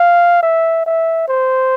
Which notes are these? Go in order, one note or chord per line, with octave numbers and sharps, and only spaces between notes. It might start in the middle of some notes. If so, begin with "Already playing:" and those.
Already playing: F5
E5
E5
C5